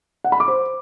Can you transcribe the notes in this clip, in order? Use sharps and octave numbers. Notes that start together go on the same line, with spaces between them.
F#5
B5
D6
C5